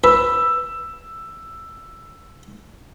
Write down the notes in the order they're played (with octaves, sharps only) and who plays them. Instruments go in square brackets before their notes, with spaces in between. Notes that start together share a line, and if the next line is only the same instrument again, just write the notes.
[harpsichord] B4 [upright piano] E6